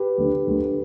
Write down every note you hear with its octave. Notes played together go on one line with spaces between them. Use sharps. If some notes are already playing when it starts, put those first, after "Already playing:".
Already playing: G4 B4
D2 D3
D2 D3